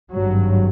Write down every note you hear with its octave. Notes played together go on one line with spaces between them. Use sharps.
G#1 G2 F#3